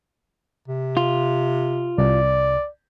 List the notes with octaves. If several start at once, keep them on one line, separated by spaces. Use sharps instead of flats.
C3
F4
C2 D5